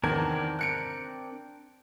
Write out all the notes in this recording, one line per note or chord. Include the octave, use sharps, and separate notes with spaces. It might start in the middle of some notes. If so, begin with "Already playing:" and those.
E2 D#3 C4 D4 A#4 G#6
F#6 C#7 D7